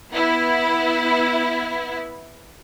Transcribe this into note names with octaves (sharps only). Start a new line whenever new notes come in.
B3 E4